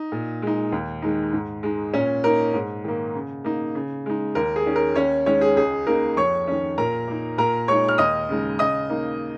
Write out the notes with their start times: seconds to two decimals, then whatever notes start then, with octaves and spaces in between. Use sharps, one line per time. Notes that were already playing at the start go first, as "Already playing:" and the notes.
Already playing: D#4
0.12 A#2
0.42 G#3 D#4
0.72 D#2
1.02 D#3 G#3 D#4
1.33 G#2
1.63 G#3 D#4
1.94 A#2 C#4 C#5
2.24 A#3 D#4 A#4
2.54 G#2
2.84 D#3 A#3
3.14 C#3
3.44 A#3 D#4
3.75 C#3
4.06 G#3 D#4
4.35 D#2 A#4
4.56 G#4
4.66 D#3 C#4
4.76 A#4
4.95 D#2 C#4 C#5
5.26 D#3 G#3 C#4 C#5
5.41 G#4
5.57 C#2 G#4
5.87 C#3 A#3 D#4 A#4
6.17 F2 C#5 C#6
6.48 D#3 C#4
6.78 A#2 A#4 A#5
7.08 A#3 D#4
7.38 A#2 A#4 A#5
7.68 G#3 D#4 C#5 C#6
7.88 F6
7.98 D#2 D#5 D#6
8.29 C#3 G#3 D#4
8.59 C#3 D#5 D#6
8.90 A#3 D#4